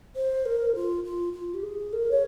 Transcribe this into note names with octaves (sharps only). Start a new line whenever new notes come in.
C5
A#4
F4
F4
F4
G4
G#4
A#4
C#5